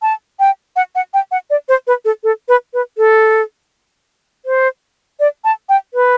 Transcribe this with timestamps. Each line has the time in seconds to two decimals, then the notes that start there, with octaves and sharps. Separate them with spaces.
0.02 A5
0.39 G5
0.76 F#5
0.95 F#5
1.14 G5
1.31 F#5
1.50 D5
1.69 C5
1.87 B4
2.05 A4
2.24 A4
2.48 B4
2.74 B4
2.98 A4
4.46 C5
5.20 D5
5.44 A5
5.69 G5
5.94 B4